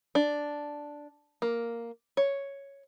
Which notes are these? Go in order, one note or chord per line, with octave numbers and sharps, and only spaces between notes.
D4
A#3
C#5